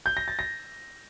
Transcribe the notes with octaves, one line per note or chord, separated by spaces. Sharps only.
G6
A#6
A6
A#6